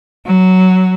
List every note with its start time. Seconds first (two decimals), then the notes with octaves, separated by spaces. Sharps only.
0.25 F#3